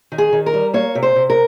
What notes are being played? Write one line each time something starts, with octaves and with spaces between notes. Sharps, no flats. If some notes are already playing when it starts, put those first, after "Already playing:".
D#3
G#4
D#3
A#4
G3
A#3 C#5
C3
C5
C3
A#4